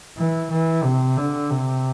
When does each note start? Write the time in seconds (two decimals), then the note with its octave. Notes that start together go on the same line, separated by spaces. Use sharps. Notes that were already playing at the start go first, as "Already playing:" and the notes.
0.17 E3
0.50 E3
0.84 C3
1.17 D3
1.51 C3